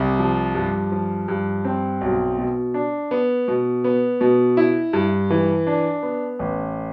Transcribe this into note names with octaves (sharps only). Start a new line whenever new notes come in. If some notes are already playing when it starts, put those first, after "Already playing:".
Already playing: C2 C3
F3
G2
F3
G2
C4
B1
B2
D4
B3
B2
B3
B2
E4
G2
E3
D4
B3
A1